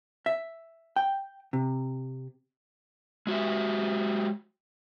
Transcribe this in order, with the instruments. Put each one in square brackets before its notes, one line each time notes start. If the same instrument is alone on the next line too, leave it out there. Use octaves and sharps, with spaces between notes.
[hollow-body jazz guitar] E5
G5
C3
[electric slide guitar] G#3 F#4 G4 E5